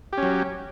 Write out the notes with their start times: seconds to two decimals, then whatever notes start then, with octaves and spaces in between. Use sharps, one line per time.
0.13 G4
0.18 C#4
0.22 F#3